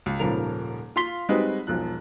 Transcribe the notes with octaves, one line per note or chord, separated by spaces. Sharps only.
C#2
D#1 G#2 C#3 F3 A#4 F7
F4 F5 C6 B6 G7
G3 G#3 C4 D#4 F#4 B4
E1 B1 F3 F#6